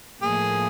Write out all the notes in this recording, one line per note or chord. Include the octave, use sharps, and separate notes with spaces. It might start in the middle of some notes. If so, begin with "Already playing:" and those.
A2 F3 A#3 G#4